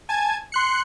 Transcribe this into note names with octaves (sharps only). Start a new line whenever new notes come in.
G#5 A5 G#6
C6 F#6 C#7